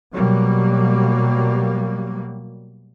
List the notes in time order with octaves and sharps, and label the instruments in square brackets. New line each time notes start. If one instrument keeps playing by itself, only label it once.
[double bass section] B2 F#3 G3 A#3